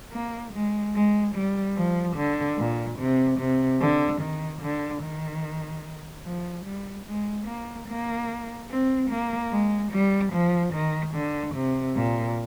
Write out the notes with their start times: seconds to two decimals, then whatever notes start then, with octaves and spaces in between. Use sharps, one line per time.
0.12 A#3
0.53 G#3
0.94 G#3
1.35 G3
1.76 F3
2.16 D3
2.58 A#2
2.98 C3
3.39 C3
3.80 D3
4.21 D#3
4.62 D3
5.02 D#3
6.25 F3
6.66 G3
7.06 G#3
7.47 A#3
7.88 A#3
8.70 C4
9.10 A#3
9.51 G#3
9.92 G3
10.33 F3
10.74 D#3
11.14 D3
11.55 C3
11.96 A#2